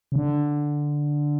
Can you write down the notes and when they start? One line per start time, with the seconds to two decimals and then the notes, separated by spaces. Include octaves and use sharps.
0.12 C#3
0.16 D3